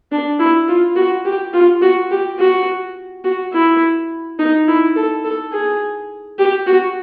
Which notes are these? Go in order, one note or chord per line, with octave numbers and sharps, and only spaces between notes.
D4
E4
F4
F#4
G4
F4
F#4
G4
F#4
F#4
E4
D#4
E4
A4
A4
G#4
G4
F#4